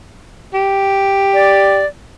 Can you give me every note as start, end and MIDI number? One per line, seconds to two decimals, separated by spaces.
0.54 1.81 67
1.34 1.86 74